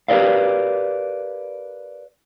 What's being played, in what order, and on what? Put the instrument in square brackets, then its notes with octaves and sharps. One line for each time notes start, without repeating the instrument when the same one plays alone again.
[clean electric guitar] G4 A#4 B4 D5 F5